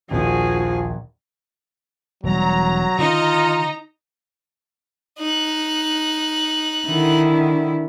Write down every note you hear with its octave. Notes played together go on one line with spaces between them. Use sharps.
A#1 D#2 F3 F#4 G#4
E1 F#3 G3 A#5
D3 D#3 D#4 F4 D#5
D#4 F#6
D3 D#3 E4